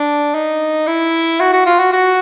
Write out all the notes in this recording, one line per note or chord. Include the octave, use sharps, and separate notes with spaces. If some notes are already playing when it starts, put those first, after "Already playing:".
Already playing: D4
D#4
E4
F#4
F#4
F4
F#4
F#4